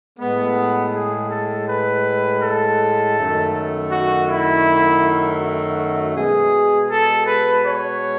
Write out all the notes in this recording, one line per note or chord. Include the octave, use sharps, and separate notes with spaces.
A2 G#3 B3
G#4
A4
B4
A4
F#2 D#3 A3
F#4
E4
F#4
B2 G#3 G#4
A4
B4
C#5